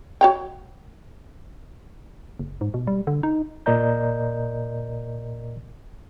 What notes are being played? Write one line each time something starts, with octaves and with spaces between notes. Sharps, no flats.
F#4 C#5 G5
F#1
G#2
B2
G3
D3
D#4
A#2 A#4 D5 D#5 A#5 G6